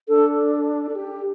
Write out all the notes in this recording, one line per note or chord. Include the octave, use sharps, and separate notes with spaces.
D4 A4
A4
G4